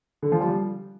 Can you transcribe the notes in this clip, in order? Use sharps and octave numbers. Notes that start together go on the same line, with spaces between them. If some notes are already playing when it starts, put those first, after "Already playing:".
D3
F3
G3